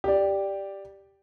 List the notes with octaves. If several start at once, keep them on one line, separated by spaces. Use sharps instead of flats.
G4 D5